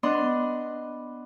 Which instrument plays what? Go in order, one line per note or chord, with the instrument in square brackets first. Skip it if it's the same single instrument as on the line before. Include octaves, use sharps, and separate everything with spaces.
[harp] B3 D4 D#5 C6